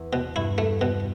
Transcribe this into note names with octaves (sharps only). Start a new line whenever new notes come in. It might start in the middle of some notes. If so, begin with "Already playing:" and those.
Already playing: E2
B2
G2 E4
A3
B2